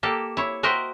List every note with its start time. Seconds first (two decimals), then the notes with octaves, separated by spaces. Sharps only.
0.03 A#3 G4 A4
0.37 E4 C#5
0.63 F#4 A#4 C5 D#5 E5 G5